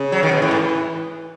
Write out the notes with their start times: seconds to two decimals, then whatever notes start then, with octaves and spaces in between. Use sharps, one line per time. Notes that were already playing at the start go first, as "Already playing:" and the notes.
Already playing: C#3
0.12 F#3
0.23 D#3
0.31 B2
0.41 A2 E3
0.51 G#2